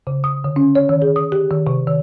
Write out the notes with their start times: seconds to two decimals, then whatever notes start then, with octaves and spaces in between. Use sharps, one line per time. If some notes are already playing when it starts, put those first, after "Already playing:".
0.07 C#3
0.24 D#6
0.44 D3
0.56 C#4
0.75 C#5
0.89 D#3
1.02 G#4
1.16 D#6
1.32 G4
1.51 D#3
1.67 C3
1.87 D#3